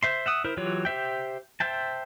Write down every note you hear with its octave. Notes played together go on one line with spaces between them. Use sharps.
C5 E5 C6
E5 F#5 D#6
E4 A#4 C5
E3 F#3 F4 G4 C#5
G4 C5 E5 G5
C5 E5 G5 A5